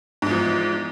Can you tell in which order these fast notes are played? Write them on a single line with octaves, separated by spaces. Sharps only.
G#2 E2 F3